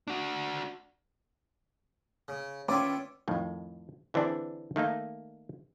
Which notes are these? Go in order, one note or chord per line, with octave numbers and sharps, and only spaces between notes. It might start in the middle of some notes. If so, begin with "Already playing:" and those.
D4 F#4
C#3
D#3 B3 C#4 F4 D5 E5 D6
F2 A2 D#3
D3 E3 C4 D4 G#4
D#3 A3 A#3 D#4